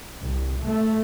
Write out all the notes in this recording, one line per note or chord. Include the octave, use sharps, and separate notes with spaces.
C2
A3